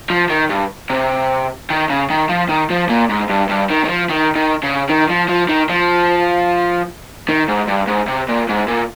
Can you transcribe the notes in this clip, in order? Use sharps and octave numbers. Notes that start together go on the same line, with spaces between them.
F3
D#3
G2
C3
D#3
C#3
D#3
F3
D#3
F3
A#2
G#2
G2
G2
D#3
D#3
F3
D#3
D#3
C#3
D#3
F3
F3
D#3
F3
D#3
G#2
G2
G#2
C3
A#2
G#2
A#2